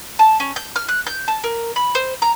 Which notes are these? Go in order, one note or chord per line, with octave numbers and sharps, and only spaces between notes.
A5
C#4
G6
F6
F#6
G6
A5
A#4
B5
C5
A#5